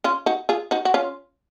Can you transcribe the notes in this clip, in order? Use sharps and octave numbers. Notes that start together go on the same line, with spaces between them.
C#4 F4
D#4 F#4
F4 G#4
D#4 F#4
F#4
C#4 F4